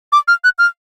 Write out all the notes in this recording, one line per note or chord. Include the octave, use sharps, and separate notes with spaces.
D6
F6
F#6
F6